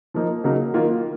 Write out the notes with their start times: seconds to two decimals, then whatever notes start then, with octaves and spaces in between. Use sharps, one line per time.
0.14 F3 A#3 D#4
0.44 C#3 F#3 A#3 D#4
0.74 D#3 A#3 F4